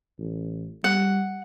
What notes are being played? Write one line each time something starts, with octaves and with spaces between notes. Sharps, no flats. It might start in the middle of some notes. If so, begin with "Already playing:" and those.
A1
G3 F#5